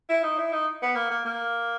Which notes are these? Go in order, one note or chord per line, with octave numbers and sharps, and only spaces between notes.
E4
D#4
E4
D#4
B3
A#3
A#3
A#3